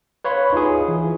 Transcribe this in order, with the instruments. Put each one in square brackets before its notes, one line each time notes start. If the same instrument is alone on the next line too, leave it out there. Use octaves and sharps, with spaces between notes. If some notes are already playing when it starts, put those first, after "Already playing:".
[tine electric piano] B4 C#5 F5 B5 C6
D#4 F4 G#4
E3